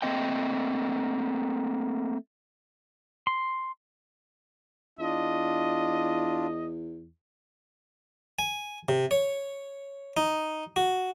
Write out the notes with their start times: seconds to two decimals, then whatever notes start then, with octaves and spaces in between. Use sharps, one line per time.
0.02 A3 A#3 C4 D#5 G5
3.27 C6
4.99 E2 D4 F4 D#5
8.39 G#5
8.89 C3
9.11 C#5
10.17 D#4
10.76 F#4